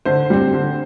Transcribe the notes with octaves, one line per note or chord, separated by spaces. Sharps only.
D3 C5
G3 C4
D3